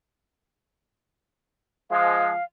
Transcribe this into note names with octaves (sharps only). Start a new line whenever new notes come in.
F3 G#3 F5